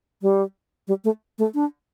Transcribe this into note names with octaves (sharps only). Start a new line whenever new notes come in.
G3
G3
A3
A3
D4